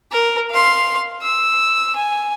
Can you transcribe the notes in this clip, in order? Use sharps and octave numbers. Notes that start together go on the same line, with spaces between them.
A#4
F5 C6
E6
G#5